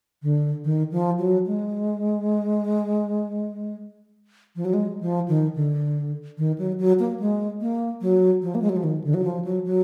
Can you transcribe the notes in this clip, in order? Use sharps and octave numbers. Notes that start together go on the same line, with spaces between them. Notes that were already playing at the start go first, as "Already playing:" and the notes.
D3
D#3
F3
F#3
G#3
F3
F#3
G#3
F3
D#3
D3
D#3
F#3
F#3
A#3
G#3
A#3
F#3
F3
A#3
G#3
F#3
F3
D#3
D3
F#3
F3
F#3
F#3